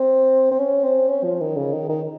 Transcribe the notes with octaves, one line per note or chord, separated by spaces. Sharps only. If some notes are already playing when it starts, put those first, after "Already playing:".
Already playing: C4
C4
C#4
C4
C#4
F3
D#3
C#3
D#3
D#3